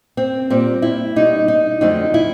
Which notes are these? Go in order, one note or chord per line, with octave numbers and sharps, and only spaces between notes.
C4
A#2 G3 C4
E4
B2 G3 D#4
D#4
F2 D3 F#3 A3 D#4
E4